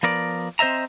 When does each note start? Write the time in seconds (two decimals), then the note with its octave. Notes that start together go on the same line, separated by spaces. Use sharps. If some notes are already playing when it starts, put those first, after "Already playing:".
0.03 F3 B3 A#4 D5
0.59 C4 C5 D#5 E5 A#5